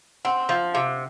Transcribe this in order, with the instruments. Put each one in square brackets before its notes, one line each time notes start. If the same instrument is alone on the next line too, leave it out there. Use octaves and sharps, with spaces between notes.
[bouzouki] C4 [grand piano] F#5
[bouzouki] F3 [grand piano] F5
[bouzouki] C3 [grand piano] F5